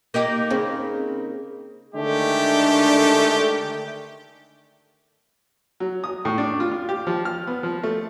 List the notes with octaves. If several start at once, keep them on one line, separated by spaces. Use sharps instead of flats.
A#3 D#4 G4
C#3 C4
D3 D#3 G#3 A3 D4 G4
F#3
D#6
A2
D4
F4
F4
G4
F3
F6
B3
F3
A3